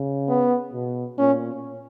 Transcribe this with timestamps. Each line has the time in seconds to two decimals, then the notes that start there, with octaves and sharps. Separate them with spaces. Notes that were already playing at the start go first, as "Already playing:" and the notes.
Already playing: C#3
0.29 B3
0.73 B2
1.19 A#2 C#4